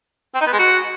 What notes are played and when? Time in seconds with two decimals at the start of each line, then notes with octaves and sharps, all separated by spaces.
0.35 C4
0.41 D#4
0.47 B3
0.53 G#3
0.59 F#4